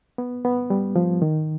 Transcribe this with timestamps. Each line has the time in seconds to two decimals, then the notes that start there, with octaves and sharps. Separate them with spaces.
0.18 B3
0.45 B3
0.70 G3
0.96 F3
1.22 D#3